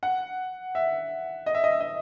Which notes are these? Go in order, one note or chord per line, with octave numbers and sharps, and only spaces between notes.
F#5
E5
D#5
E5
D#5
E5
D#5